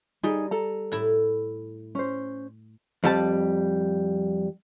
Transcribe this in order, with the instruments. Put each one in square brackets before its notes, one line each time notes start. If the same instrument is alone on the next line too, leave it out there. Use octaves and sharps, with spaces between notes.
[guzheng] G3 G5 [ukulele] D#4 G#4
[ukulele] A4 A#5
[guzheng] A2 E4
[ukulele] C#4 C5
[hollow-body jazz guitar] F2 G3 A5